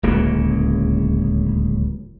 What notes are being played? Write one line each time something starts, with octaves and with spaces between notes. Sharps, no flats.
D1 C#2 C#3 A#3